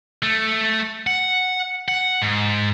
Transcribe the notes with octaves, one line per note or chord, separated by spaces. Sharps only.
A3
F#5
F#5
G#2